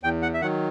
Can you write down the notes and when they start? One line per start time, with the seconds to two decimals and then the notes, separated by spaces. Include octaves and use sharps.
0.03 E2 G5
0.22 F#5
0.34 E5
0.41 D#3 F#3 F#5